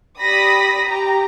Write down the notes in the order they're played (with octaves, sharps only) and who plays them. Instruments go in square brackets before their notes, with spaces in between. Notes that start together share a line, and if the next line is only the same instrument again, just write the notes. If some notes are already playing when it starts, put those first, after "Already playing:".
[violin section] G4 D5 B5 D#6 A#6 B6
G4 A#5